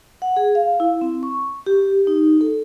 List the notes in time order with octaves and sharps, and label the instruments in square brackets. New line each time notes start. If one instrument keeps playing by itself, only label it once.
[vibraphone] F#5
G#4
F5
E4
C4
C#6
G4
D#4
A4